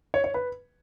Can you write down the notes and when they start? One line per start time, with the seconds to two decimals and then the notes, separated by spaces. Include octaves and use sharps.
0.14 C#5
0.24 C#5
0.34 B4